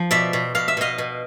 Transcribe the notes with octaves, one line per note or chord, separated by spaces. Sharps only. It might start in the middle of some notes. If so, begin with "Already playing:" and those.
Already playing: F3
B2 D5 E5
B2
B2 F5
E5
B2 D#5 F5
B2